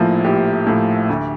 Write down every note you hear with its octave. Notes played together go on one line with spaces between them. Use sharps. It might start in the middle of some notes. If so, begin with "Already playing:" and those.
Already playing: A#1 A2 F3 A#3 E4
A#1 G4
A2 F3
D2